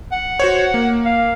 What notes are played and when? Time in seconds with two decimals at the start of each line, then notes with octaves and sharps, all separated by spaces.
0.12 F#5
0.40 F#4 C5 C#5
0.74 A#3
1.05 F5